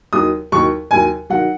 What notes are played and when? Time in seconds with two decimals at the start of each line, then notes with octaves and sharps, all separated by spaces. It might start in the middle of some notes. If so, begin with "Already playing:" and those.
0.13 D#2 D#3 F#3 D#6
0.52 D#2 D#3 F#3 C#6
0.91 D#2 D#3 F#3 G#5
1.30 D#3 F#3 F#5